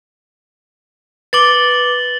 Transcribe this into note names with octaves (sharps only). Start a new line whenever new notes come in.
B4 D6 A6 F#7 G7